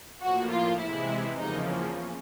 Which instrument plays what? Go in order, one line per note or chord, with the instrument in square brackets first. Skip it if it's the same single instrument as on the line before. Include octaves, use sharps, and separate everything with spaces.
[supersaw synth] A2 F3 A#3 [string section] F#4
[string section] F4
[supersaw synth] C3 E3 G#3 [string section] E4
[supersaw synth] E2 C#3 F3 A#3 [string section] D#4
[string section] C#4